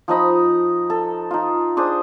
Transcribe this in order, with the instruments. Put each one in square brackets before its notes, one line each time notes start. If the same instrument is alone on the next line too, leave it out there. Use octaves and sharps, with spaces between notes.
[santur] F3 D#4 D#5 B5
A4
D#4 F4
D4 G#4 C5 D#6